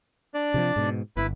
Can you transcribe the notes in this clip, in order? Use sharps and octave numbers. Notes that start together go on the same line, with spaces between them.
D4 D5
C3 D#3 F3
G#2 B2
G1 E4 B4